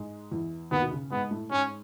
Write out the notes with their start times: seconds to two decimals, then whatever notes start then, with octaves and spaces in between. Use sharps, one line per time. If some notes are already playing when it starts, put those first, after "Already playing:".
Already playing: G#2 G#3
0.31 E2 E3
0.71 D#2 D#3 B3
0.82 B2
0.91 C#3
1.11 G#2 G#3 B3
1.31 A2 A3
1.51 G#2 G#3 C#4